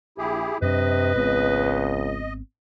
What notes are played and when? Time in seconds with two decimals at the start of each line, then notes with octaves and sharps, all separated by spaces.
0.18 A#1 E4 G4 G#4
0.62 F#2 C3 D4 B4 D#5
1.16 G#1 C#2 B3 C4